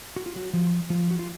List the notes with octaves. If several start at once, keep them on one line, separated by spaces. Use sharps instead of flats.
F#4
F4
F#3 F#4
F3 F4
F3 F4
F#4
F4